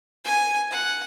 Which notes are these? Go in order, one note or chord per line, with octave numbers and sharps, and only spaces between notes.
G#5
F#5